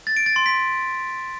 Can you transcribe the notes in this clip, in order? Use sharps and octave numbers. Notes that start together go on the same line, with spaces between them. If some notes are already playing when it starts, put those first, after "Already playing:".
A6
D7
A6
C6
B6